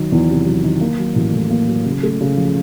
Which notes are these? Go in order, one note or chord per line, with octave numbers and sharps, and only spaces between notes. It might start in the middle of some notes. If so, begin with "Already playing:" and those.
Already playing: D#3 F#3
E2
C3
F#3
D#3
A#3
F#3
A1
A2
A#3
F#3
C#3
A3
C#3
F3